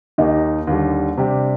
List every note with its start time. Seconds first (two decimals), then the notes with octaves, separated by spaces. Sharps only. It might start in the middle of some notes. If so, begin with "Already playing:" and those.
0.18 D#2 D#3 A#3 D#4 G4
0.67 D#2 D3 G3
1.17 C3 G3 D4 G4